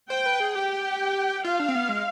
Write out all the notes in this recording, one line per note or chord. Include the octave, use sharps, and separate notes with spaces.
C5 G5
B4
G#4
G4 G5
F4 F5
D4
C4
B3
G#3